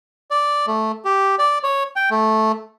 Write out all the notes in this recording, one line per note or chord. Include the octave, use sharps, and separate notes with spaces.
D5
A3
G4
D5
C#5
G5
A3